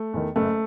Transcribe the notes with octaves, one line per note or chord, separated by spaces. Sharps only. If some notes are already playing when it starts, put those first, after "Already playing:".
Already playing: A3
E2 D#3
F#1 A3